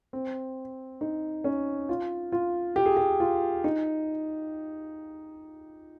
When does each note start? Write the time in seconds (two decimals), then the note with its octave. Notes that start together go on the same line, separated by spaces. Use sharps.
0.13 C4
1.01 D#4
1.44 C#4
1.89 F4
2.32 F4
2.76 G4
2.86 G#4
2.97 G4
3.20 F4
3.64 D#4